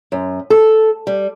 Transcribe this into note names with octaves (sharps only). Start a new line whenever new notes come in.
F#2
A4
G3